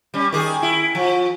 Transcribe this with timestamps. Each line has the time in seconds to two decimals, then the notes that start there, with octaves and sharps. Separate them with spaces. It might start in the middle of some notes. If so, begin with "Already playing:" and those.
0.14 G3 C#4
0.33 D#3 G#4
0.62 E4
0.95 F3